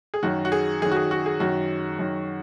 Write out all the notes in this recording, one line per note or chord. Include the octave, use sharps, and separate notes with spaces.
G#4
F#2 D#3 F#4
F#4
G#4
F#2 D#3 G#4
F#4
G#4
F#4
G#4
F#2 D#3 F#4
F#2 D#3